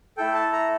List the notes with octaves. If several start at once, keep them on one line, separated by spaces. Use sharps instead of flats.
A3 E4 A4 G5
A5
A#5